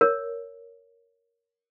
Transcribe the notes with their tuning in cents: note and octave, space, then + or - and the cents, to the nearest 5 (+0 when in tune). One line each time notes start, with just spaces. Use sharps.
A#4 +0 C#5 +10